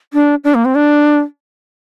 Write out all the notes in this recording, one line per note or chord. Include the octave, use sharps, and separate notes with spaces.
D4
D4
A#3
C4
D4